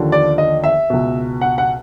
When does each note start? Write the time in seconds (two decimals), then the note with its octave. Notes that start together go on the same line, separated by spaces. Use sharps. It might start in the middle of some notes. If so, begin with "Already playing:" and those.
Already playing: D#2 D3 F3
0.12 D5
0.38 D#5
0.64 E5
0.90 C#2 B2
1.41 F#5
1.58 F#5